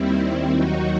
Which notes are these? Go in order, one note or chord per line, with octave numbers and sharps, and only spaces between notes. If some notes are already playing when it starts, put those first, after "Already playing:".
Already playing: D#2 D#3 G3 C4 E4
C4 E4
D#2 D#3 F#3 D#4 F#4